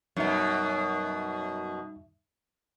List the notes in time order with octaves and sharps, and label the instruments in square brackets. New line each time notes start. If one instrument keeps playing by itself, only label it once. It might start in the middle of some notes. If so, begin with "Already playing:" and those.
[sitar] F#2 B2 [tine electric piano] G3 D#4 E5